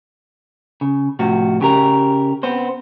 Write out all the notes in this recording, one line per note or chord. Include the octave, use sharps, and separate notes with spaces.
C#3
A2 C3 F3 F#4
C#3 G4 A#4
B3 C4 C5